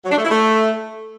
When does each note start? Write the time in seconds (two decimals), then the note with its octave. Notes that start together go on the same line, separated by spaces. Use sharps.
0.05 F#3
0.11 D4
0.18 A3
0.24 E4
0.31 A3